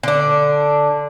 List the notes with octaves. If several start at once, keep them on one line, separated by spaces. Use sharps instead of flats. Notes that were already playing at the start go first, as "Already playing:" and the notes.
D3 D4